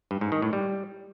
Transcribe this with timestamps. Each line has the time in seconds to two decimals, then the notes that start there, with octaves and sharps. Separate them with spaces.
0.11 G2
0.21 G#2
0.32 D#3
0.42 A2
0.53 G3